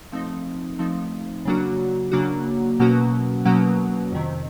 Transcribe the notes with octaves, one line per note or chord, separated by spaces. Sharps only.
F3 A3 C4 D#4
F3 A3 C4 D#4
C#3 F#3 A#3 D4 F#4
C#3 F#3 A#3 D4 F#4
B2 F#3 A#3 C#4 F#4
B2 F#3 A#3 C#4 F#4
F2 C3 D#3